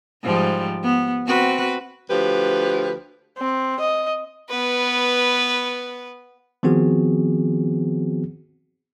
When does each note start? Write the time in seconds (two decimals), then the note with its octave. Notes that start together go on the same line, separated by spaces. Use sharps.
0.23 G#2 F3 G3
0.83 B3
1.27 C4 F#4 B4
2.10 D2 F3 G4 B4
3.38 C4
3.80 D#5
4.49 B3 B4
6.63 D#3 F3 B3 C4 F#4 G#4